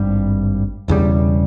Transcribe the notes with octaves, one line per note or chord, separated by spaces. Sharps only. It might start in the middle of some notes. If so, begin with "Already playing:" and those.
Already playing: G#1 G2 G3
E1 E2 C#3 G3